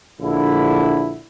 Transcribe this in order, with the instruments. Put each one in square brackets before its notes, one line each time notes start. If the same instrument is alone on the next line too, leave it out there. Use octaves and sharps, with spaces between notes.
[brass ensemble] A#1 D3 E4